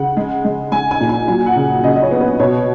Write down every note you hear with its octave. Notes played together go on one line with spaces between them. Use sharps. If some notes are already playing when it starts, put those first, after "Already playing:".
Already playing: C#3 F#5
G#3
G#3
G#3 G#5
G#5
A#2
G#5
F#3 G#5
F#5
C#3
C#3 D#5
D#5
C#5
B3
B4
B2 C#5